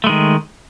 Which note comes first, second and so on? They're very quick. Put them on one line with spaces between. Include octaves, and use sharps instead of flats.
A3 G#3 D#3